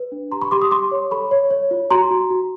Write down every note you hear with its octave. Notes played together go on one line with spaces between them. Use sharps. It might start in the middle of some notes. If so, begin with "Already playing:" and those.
Already playing: B4
D4
G4 A#5 C6
B5 C#6
G4 C6 D6
C#6 D#6
G4 C6 D6
C#5
A4 B5 C#6
C#5
C#5
F4
F#4 A#5 C6
F#4
F#4